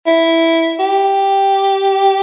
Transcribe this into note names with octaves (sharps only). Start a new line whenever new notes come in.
E4
G4